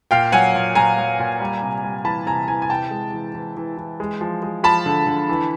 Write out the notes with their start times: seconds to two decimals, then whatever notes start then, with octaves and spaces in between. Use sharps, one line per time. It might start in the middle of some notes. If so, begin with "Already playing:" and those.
0.11 A#2 F5 G5
0.32 F#3 F#5 G#5
0.55 A#2
0.75 A#2 G#5 A#5
0.98 F#3
1.19 A#2
1.40 G3
1.62 C3
1.84 G3
2.05 E3 A5 B5
2.26 C3 G#5 A#5
2.48 E3 G#5 A#5
2.62 G#5
2.69 C3 G5 A5
2.91 G#3
3.13 E3
3.35 E3
3.57 E3
3.77 E3
4.00 G#3
4.21 F3
4.43 G#3
4.63 F3 A5 B5
4.86 D3
5.07 D3
5.29 E3